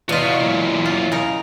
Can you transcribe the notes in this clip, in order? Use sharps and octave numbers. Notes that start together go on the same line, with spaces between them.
E2 B2 F4 F#4 D#5
F#2 A#2
F4
C#3 D#4 A#4